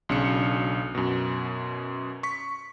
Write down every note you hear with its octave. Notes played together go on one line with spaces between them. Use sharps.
B1 C#3 D4 C#7
F#2 B2
C#6 B6